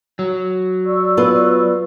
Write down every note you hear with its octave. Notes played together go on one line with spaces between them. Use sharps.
F#3
D5 C#6 E6
B3 F4 B4